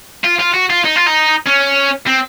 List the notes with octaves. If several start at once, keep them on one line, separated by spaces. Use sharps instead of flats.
F4
F4
F#4
F4
D#4
F4
D#4
C#4
C4